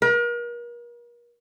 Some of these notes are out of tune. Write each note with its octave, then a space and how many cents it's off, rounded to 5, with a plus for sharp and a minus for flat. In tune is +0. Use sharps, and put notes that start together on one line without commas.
A#4 +40